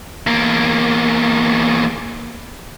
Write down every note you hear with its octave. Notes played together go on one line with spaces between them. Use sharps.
E2 A#3